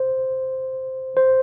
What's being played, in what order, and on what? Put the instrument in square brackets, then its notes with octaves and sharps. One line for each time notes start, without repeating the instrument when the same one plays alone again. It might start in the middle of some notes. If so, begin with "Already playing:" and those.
Already playing: [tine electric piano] C5
C5